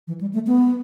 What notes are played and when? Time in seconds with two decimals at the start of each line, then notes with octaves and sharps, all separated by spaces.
0.07 E3
0.21 G3
0.33 A3
0.47 B3